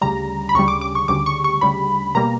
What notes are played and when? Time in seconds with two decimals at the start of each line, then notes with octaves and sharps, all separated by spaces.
0.01 D2 C#3 G3 A#5
0.49 B5
0.55 D2 C#3 G3 C#6
0.68 D6
0.81 D6
0.95 C#6
1.08 D2 C#3 G3 D6
1.26 C#6
1.44 C#6
1.61 D2 C#3 G3 B5
2.15 B2 G3 A#3 A#5